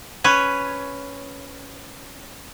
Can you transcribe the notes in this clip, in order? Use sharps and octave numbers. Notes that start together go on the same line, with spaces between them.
C#4 B4 C#5